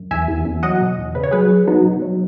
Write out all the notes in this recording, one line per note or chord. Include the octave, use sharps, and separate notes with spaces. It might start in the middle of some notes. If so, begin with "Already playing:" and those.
Already playing: F#2
E2 E5 G#5
E2
E2
F#3 D#5 F#5
B2
E2
C#3 B4
C#5
F#3 G#4 B4
F#2
F#3 B3 D#4
B2
F#3